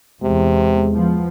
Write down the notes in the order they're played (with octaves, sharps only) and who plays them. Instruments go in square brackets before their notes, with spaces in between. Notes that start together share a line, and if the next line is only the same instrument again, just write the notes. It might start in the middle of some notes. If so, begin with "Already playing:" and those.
[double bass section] E2 [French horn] C3 [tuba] G#3
[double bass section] F3 B3